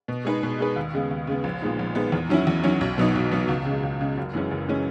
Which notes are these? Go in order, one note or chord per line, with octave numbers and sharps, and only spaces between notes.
B2
G#3 D#4 G#4 B4
B2
G#3 D#4 G#4 B4
D#2
C#3 G#3 B3
D#2
C#3 G#3 B3
A#1
A#2 G#3 B3 D#4
A#1
A#2 G#3 B3 D#4
E2
D#3 F#3 C#4 E4
E2
D#3 F#3 C#4 E4
B1
B2 F#3 B3 D#4
B1
B2 F#3 B3 D#4
C#2
C#3
G#3
C#2
C#3 G#3
F#1
F#2 E3 G#3 C#4
F#1
E3 G#3 C#4